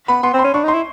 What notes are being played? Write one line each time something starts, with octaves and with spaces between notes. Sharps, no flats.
B3 B5
B3 C6
C4
C6
C#4
D4 C#6
D#4
C6
E4